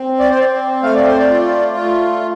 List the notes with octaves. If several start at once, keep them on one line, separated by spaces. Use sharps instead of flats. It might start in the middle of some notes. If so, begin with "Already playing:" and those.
Already playing: C4
D5
C5
C4 D5
A3 F5
D5
C5
D5
F4
A3